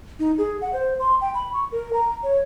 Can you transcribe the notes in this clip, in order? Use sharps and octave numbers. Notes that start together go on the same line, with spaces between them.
D#4
G#4
F#5
C5
C6
G5
B5
C#6
A#4
A#5
C#5